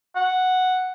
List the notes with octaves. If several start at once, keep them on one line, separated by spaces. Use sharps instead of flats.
F#5